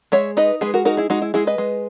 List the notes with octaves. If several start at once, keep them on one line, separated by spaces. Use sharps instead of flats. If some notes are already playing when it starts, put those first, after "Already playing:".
G#3 C#5 E5
D#4 B4 D#5
G#3 G#4 B4
F#4 A#4
D#4 F#4 A#4
E4 G#4
G#3 D#4 F#4
E4
G#3 E4 G#4
B4 D#5
G#3